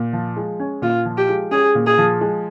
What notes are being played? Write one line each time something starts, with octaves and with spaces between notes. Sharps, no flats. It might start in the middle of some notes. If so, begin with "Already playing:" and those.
Already playing: A#2
F3
G#3
C#4
A#2 F4
F3
G4
G#3
C#4 G#4
A#2
G#4
F3
G#3